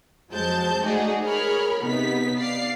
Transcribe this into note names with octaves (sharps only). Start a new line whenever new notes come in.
F2 F#3 G#3 C5 A5 G6
G#3 A3 D#4 F#4 G#4 D5
G#4 A#4 C#5 B5 F6
C3 B3 D#4 B6
D5 F5 C7